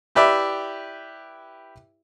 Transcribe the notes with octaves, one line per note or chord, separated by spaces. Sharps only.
E4 G4 B4 D5 E5